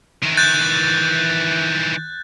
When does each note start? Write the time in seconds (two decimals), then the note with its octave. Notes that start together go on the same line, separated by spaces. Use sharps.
0.23 D#3 E3
0.37 F#6 G6 A6